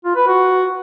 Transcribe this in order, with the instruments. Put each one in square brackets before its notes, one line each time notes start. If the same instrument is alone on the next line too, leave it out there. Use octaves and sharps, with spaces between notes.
[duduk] F4
B4
F#4